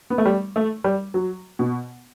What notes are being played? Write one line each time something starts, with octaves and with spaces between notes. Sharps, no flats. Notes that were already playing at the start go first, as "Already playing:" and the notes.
B3
A3
G3
A3
G3
F#3
B2